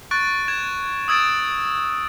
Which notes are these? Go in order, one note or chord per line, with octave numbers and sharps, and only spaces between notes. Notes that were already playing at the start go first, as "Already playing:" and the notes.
C#6 F#6 A6 D7
G#6 E7
D#6 E6 G#6 A6 D7 E7